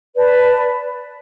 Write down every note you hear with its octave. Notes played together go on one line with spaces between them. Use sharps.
B4 D5 A5